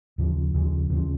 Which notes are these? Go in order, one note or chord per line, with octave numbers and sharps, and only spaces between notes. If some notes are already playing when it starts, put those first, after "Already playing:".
D#2 C#3 F3
D#2 C#3 F3
D#2 C#3 F3